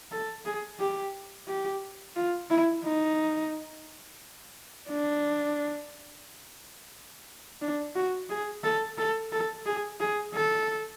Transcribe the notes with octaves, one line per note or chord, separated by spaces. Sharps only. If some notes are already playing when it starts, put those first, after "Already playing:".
A4
G#4
G4
G4
F4
E4
D#4
D4
D4
F#4
G#4
A4
A4
A4
G#4
G#4
A4